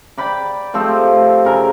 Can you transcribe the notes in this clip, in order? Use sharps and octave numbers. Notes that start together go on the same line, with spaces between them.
D5 G5 B5 D6
F3 A3 C4 G4
C#3 A#4